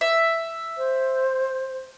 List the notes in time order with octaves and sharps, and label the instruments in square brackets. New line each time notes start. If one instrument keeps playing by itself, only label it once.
[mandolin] E5
[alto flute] C5